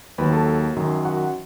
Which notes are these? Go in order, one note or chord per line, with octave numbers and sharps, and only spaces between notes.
D#2 D#3 F#3 B4 B5
A4 A5
F#2 D#3 F#3
F#4 F#5